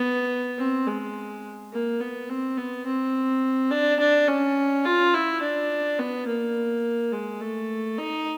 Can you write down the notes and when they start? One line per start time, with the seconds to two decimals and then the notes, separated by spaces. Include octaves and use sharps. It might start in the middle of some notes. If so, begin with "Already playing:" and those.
Already playing: B3
0.58 C4
0.87 G#3
1.72 A#3
2.00 B3
2.29 C4
2.57 B3
2.86 C4
3.71 D4
4.00 D4
4.28 C#4
4.85 F4
5.14 E4
5.42 D4
5.99 B3
6.27 A#3
7.12 G#3
7.40 A3
7.98 D#4